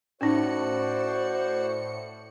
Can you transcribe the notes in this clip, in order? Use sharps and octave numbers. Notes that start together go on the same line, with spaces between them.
A2 C#4 D#4 F#4 C5 D5 C#7